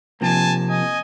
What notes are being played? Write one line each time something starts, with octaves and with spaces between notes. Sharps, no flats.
C3 F3 A#3 G#5 A5
D#5 G#5